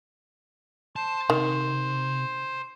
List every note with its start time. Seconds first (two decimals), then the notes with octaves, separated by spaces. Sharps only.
0.96 C5 A5
1.30 C3 D#3